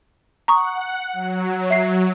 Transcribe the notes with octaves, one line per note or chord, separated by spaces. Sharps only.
F#5 A#5 C#6 D#6
F#3
E5 C7